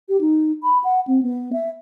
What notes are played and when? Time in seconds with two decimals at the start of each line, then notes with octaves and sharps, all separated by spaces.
0.09 G4
0.21 D#4
0.63 B5
0.84 F#5
1.07 C4
1.23 B3
1.53 E5